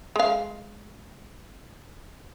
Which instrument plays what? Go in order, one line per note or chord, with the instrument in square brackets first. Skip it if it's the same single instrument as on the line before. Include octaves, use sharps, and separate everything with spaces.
[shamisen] G#3 F5